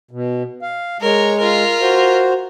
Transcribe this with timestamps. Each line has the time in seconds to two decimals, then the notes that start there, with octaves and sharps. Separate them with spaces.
0.11 B2
0.62 F5
1.01 G#3 A#4 C#5
1.39 F4 A#4
1.81 F#4 C5